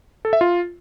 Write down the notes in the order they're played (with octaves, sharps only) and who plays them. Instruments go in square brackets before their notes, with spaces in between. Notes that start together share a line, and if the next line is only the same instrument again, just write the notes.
[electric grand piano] A4
E5
F4